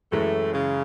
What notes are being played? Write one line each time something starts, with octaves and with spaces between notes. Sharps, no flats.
F#2 A2 E3 G#3 A3
C#3